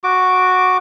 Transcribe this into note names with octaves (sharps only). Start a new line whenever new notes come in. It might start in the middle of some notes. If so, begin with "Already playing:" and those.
F#4 D6